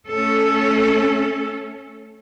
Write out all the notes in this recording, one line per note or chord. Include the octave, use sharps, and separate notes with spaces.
A3 C#4 A4